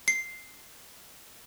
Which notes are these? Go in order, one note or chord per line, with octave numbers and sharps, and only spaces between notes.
C7